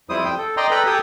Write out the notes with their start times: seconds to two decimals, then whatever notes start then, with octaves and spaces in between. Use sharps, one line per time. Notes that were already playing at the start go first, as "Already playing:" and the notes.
0.10 F2 G3 E4 C5 D#6
0.25 G5
0.38 A4
0.57 D5 D#5 G5 A#5 C6
0.71 A4 B4 G5 A#5 B5
0.86 G4 A4 G5 G#5 D#6